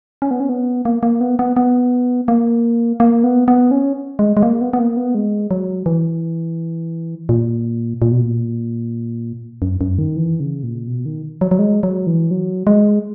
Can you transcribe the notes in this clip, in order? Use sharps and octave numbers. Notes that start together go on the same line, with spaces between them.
C#4
B3
C#4
B3
A#3
A#3
B3
B3
B3
A#3
A#3
B3
B3
C#4
G#3
G#3
A#3
B3
B3
A#3
B3
G#3
F#3
E3
A#2
A#2
B2
A#2
F#2
F#2
D#3
E3
C#3
A#2
B2
D#3
F#3
F#3
G#3
F#3
E3
F#3
G#3